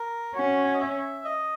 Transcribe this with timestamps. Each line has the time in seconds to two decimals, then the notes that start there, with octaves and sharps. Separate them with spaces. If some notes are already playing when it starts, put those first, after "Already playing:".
Already playing: A#4
0.35 C#4 F#4
0.74 D#5
0.80 E5
1.25 D#5